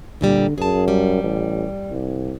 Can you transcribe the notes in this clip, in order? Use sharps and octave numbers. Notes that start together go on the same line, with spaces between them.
D2 A#2 D3 G3
F#2 G#4 A5
G3
A1
C2